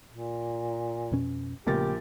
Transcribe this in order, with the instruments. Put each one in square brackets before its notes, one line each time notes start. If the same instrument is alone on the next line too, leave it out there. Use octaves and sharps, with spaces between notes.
[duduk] A#2
[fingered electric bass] F2 B2 C#4
[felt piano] A#1 A#4 A6 [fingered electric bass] C#3 A3 B3 [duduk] G4